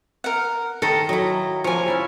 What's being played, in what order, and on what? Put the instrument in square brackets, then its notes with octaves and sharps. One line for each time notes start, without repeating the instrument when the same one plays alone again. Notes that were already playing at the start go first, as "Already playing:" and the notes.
[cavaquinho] A#4 F#5
[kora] D#3 [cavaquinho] A4 A#5
[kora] F#3 [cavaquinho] E4 D#5
[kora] F3 A#3 [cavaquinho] C#5 G#5
[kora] C#4 E4 A4